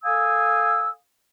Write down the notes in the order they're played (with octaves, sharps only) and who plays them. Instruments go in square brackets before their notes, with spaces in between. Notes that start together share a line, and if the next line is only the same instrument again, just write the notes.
[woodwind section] A4 F5 G#5 D#6 E6